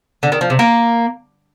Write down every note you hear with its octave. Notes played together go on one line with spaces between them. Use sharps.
D3
D#3
F3
C3
A#3